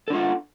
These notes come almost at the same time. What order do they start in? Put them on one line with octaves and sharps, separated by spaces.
A4 D4 F4 F#5